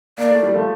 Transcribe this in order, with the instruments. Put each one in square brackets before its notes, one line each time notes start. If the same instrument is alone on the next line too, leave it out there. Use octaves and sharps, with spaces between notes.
[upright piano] A#3 [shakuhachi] D5
[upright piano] A3
G3
F3 A3